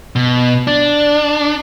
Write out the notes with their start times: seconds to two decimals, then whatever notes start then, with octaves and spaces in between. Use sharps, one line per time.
0.16 B2
0.67 D4